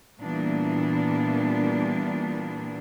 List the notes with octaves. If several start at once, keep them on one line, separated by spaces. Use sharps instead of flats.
A#2 E3 G3 A#3 B3 D4